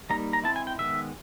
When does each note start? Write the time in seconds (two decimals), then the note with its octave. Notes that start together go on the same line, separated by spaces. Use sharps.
0.10 G3 A#3 D#4 A#5
0.33 A#5
0.44 G#3 C4 E4 A5
0.56 G#5
0.67 G5
0.78 D#3 G#3 B3 E5